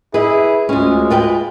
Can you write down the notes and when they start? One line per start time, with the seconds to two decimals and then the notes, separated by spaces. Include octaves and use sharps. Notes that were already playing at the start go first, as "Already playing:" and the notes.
0.14 E4 G#4 B4 D#5
0.69 D2 G#3 C#4 F4
1.10 F4 B4 G5